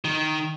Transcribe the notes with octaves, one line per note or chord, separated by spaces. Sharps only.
D#3